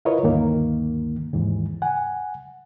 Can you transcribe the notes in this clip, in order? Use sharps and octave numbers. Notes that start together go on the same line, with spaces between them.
E4 F4 A#4 B4 C#5 D#5
D2 G2 D#3 A#3
D#2 G#2 E3
F#5 G#5